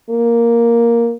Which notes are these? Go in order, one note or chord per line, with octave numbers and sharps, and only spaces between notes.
A#3